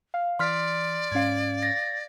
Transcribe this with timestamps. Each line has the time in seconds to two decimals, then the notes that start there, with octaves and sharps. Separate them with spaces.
0.14 F5
0.39 E3 D5 C6 F6 B6
1.12 G#2 C#4 F5 G#6
1.63 A6 A#6